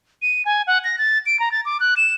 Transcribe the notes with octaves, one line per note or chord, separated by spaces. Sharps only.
D#7
G#5
F#5
A#6
A6
D7
A#5
A6
D6
F#6
E7